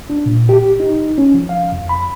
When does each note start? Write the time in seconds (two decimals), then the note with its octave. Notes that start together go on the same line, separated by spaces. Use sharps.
0.10 D4
0.26 A#2
0.49 G4
0.80 D#4
1.18 C#4
1.34 F3
1.49 F5
1.72 F2
1.89 B5